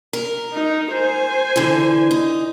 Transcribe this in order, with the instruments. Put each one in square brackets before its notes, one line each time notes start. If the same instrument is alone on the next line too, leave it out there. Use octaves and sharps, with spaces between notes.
[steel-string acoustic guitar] A#4
[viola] D#4
C5 G#5
[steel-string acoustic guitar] D3 E3
D#4